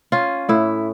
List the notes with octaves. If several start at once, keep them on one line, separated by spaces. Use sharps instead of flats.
C#4 F4
A2 E4